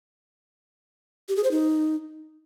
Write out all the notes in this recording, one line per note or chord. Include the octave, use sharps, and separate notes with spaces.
G4
G#4
C5
D#4